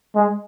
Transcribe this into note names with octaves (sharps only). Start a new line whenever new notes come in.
G#3